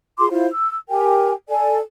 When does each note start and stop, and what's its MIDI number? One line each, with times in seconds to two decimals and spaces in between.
0.18 0.29 65
0.18 0.29 68
0.18 0.29 84
0.18 0.29 86
0.30 0.47 64
0.30 0.47 65
0.30 0.47 72
0.30 0.47 77
0.50 0.76 88
0.90 1.31 67
0.90 1.31 70
0.90 1.31 79
0.90 1.31 80
1.48 1.78 69
1.48 1.78 74
1.48 1.78 80